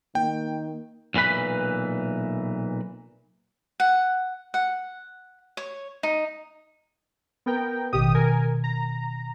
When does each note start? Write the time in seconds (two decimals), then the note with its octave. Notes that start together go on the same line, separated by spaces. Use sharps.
0.15 D#3 A#3 G5
1.14 B1 A#2 E3 B4 B5
3.80 F#5
4.54 F#5
5.57 C#5
6.03 D#4
7.46 B3 A#4 G5
7.93 A1 B2 D#3 G4 D#6
8.15 A#4 G#5
8.64 A#5